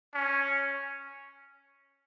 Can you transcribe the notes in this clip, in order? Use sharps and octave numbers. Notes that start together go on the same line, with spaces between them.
C#4